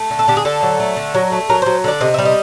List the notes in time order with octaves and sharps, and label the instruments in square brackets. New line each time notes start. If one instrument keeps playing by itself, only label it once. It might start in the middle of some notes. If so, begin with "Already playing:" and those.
Already playing: [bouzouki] A3
D3
A4
D3 G4
G#4
D3 A4
F#3
A3
D3
F#3
A3
F#3 A#4
F#3 C5
D3 D5
C3 D#5
G3 E5
D#5